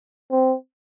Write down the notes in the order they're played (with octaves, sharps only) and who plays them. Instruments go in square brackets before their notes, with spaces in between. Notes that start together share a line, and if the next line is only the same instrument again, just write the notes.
[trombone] C4